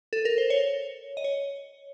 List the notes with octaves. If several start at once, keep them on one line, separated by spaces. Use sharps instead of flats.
A4
A#4
C5
C#5
D#5
C#5